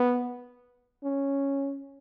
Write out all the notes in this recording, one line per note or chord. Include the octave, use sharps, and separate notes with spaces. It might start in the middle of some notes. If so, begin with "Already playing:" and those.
Already playing: B3
C#4